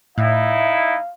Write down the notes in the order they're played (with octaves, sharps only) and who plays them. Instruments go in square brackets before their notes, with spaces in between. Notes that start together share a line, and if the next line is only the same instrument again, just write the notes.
[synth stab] A2 [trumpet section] D#4 E4 [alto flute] E5 [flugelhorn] F5